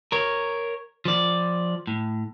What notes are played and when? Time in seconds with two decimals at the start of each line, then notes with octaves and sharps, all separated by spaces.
0.12 A#4 C#5
1.05 F3 D5
1.87 A2